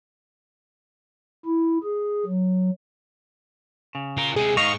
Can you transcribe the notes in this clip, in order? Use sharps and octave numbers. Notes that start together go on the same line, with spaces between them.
E4
G#4
F#3
C#3
F4 A#4
C3 G#3 G#4
G#2 D#5 F5 C#6